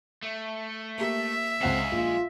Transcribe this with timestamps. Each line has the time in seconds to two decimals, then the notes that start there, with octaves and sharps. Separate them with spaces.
0.23 A3
0.98 A#3 G4 E5
1.61 C#2 G#3 C4 F5 F#5 E7
1.92 A#1 F4